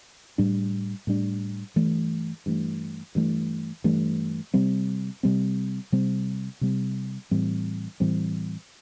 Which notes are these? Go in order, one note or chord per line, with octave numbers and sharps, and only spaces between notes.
A2 G3 D4
A2 G3 D4
G2 E3 A3
G2 E3 A3
G2 E3 A3
G2 E3 A3
C3 G3 C4
C3 G3 C4
C3 G3 C4
C3 G3 C4
A2 E3 G3 C4
A2 E3 G3 C4